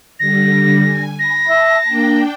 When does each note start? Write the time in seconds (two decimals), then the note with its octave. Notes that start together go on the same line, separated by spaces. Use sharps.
0.19 D3 G3 A#6
0.84 G#5
1.19 B5 A#6
1.49 E5 A5
1.88 A#3 D4 G5